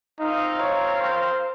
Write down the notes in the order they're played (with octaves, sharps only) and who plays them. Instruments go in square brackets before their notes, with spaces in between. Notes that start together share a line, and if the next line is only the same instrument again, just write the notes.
[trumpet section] C4 F4 A#4 F5 [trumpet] D#4
[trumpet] C#5
C5